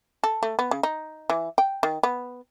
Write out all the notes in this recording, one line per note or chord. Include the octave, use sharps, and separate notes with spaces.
A4
A3
B3
C#3
D#4
E3
G5
D#3
B3